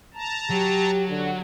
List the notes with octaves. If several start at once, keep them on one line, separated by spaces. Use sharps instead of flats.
A5 A#5
F#3 G4
D3 F#4